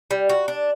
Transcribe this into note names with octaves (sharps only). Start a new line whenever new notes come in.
G3
F#4
D4